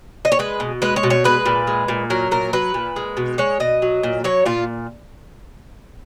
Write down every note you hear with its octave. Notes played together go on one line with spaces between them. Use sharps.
D#5
C#5
G#3 B4
B2
G#3 B4
C#5
B2
C#5
G#3 B4
A#2
G#3
A#2
F#3 A#4
A#2 A#4
F#3 B4
A#2
G#3
B2
G#3 C#5
B2 D#5
F#3
A#2
F#3 C#5
A#2 F4